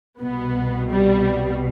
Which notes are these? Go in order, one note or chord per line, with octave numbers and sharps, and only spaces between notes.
C2 B2 B3
G3